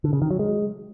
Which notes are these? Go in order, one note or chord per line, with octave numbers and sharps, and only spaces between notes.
D3
C#3
D#3
F#3
G#3